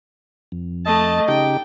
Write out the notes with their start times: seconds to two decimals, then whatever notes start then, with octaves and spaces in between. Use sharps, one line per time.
0.52 F2
0.86 A3 D#5 A5
1.28 C#3 D#4 G4 G5